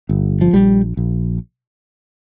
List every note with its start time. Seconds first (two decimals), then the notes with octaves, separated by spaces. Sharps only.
0.09 G1
0.41 F3
0.53 A#1 G3
0.97 A#1